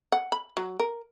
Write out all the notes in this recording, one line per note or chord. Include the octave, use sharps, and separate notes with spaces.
F#5
B5
F#3
A#4